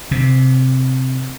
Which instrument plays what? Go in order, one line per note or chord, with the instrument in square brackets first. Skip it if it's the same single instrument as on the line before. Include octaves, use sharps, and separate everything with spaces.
[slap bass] C3